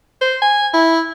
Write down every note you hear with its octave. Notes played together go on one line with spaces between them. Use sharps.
C5
G#5
E4